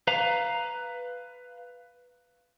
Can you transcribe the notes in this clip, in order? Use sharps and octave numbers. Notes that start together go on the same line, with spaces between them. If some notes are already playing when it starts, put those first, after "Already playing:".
B4 F5 A#5